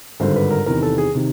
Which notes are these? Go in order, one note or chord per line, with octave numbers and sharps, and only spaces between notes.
G#1 G2 D3 C5
B4
A#4
E2 C3 D#3 A#4
A4
G#4
C3 D#3